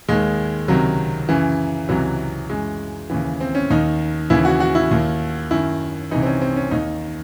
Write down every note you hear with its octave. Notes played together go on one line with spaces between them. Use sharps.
D#2 D#3 G#3
C#2 C3 D#3 F#3
F#2 C#3 E3
C#2 C3 E3 F#3
F#2 E3 G#3
D#2 C#3 E3
C4
C#4
D#2 D#3 D#4
D#2 C#3 E3 E4
F#4
F#4
E4
D#2 D#3
F#2 D#3 E4
C2 C3 E3 D#4
C4
C#4
C4
C#4
D#2 D#3 D#4